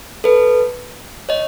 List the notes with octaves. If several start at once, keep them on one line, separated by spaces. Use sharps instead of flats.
A4 B4
C#5 D#5